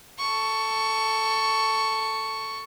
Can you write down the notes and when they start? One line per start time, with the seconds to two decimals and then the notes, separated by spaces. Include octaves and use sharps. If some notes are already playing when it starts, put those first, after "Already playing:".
0.19 A4 C#6